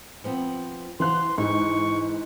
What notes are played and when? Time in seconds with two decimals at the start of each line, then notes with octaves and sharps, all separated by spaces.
0.24 F3 B3 C4
1.00 E3 C5 F5 F#5 C6 F#6
1.38 G#2 E3 C#6